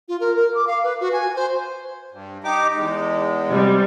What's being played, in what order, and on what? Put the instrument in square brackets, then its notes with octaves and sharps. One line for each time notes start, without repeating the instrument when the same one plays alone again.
[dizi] F4
A#4
A#4
D6
F5
B4
F#4
G#5
C5
[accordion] G2
D#4 G4 D6
E2 G#3
[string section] C3 G3